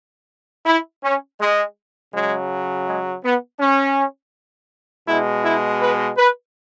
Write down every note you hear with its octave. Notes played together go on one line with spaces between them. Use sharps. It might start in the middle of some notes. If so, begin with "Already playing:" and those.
E4
C#4
G#3
C#3 F#3 G#3
G#3
B3
C#4
B2 G#3 E4
E4
B4
B4